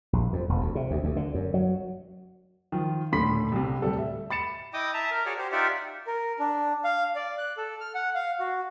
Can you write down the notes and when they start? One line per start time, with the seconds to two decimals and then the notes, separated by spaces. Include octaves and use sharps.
0.13 A#1
0.33 F2
0.49 E1
0.61 D2
0.75 C3
0.91 D2
1.04 D2
1.16 D3
1.35 F#2
1.54 F#3
2.72 D#3 F3 F4
3.12 D#1 A2 D3 B5 C6 B6
3.52 C2 C3
3.82 D1 G3 A4
3.98 E5
4.30 B5 A6 C#7 E7
4.73 E4 D#5 G5 D6 D#6
4.94 E5 A5 A#5
5.11 A#4
5.26 F#4 G#4 C#5 D5
5.38 G4 C5
5.52 D#4 F4 G4 D5 E5 F#5
6.07 A#4
6.39 D4
6.84 F5
7.15 D5
7.38 F#6
7.57 A4
7.81 F6
7.95 F#5
8.15 F5
8.40 F#4